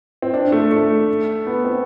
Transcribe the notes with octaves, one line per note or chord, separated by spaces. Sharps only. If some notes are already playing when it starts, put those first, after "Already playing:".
C4
D4
A3
A3
B3
C4